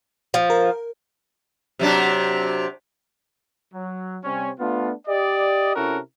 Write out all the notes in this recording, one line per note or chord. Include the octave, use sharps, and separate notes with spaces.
F3
A#4
C3 F#3 D4
F#3
C3 G3 C4 C#4
A3 B3 D4 F4
G4 D5 D#5
C3 C#4 E4 F#4 A4 A#4